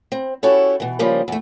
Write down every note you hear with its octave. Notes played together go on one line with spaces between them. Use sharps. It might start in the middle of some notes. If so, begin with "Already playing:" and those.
C4
C#4 E4 F#4 G4 A4 C#5
B2 E3
C#3 F3 G3 A#3 C4
E2 A3